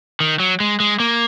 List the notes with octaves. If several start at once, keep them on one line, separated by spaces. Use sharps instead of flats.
D#3
F#3
G#3
G#3
A#3